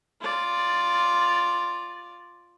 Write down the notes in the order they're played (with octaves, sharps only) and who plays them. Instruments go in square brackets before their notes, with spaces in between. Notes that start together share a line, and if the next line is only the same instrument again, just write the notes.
[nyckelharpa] F4 D5